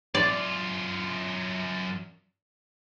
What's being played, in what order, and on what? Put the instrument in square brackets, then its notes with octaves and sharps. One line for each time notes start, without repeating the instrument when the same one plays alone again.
[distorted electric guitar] F#2 F4 [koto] D5